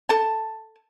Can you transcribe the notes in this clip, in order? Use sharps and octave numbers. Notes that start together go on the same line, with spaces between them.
A4 A5